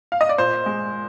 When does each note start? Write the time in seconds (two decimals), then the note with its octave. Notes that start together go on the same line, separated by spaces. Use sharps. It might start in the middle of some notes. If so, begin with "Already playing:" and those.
0.12 F5
0.21 D#5
0.29 D5
0.38 A#2 C5
0.66 G#3